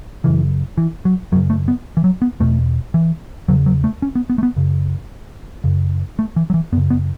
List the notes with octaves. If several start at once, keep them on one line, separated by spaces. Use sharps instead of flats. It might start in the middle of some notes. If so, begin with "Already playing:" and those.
F#2 C#3 E3
E3
F#3
F#2 C#3 F#3
A3
B3
E3
F#3
B3
E2 B2 A3
E3
E2 C#3 F#3
F#3
A3
C#4
B3
B3
A3
B3
F#2 C#3
F#2 C#3
A3
E3
F#3
E3
F#2 C#3 B3
B3